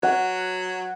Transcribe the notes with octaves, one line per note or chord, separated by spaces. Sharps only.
F#3 F#5